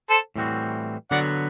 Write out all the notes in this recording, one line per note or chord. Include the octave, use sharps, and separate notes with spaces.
A4 C5
A2 E3 G3 C4 F#4
D3 F#3 B3 F#4 D5 F#5